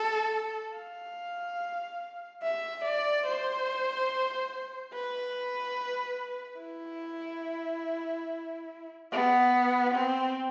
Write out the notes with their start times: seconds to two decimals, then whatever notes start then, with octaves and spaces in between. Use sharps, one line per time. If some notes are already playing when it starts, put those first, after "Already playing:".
Already playing: A4
0.77 F5
2.43 E5
2.85 D5
3.27 C5
4.94 B4
6.61 E4
9.12 B3
9.95 C4